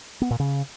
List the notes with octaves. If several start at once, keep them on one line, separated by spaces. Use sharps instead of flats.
B3
A#2
C#3